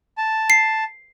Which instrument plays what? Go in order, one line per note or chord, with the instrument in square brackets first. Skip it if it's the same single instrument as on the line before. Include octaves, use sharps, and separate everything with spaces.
[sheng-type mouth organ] A5
[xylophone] C7